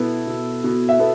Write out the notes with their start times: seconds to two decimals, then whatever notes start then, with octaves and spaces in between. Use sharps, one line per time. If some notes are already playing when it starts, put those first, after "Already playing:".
Already playing: B2 B3 E4 A4
0.27 B2
0.64 B2
0.89 E5
0.99 B3 A4